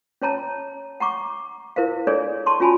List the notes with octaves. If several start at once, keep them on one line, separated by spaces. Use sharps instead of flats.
C#4 C#5 A5 A#5
F#5 A#5 C#6 D6
E4 A#4 C5 F5
D4 G#4 A4 C#5 D5
A5 C6 C#6
C#4 F4 F#4 G#5 A5 B5